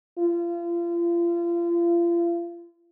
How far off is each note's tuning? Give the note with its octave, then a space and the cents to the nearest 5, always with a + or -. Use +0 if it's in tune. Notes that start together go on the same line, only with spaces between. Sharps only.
F4 -35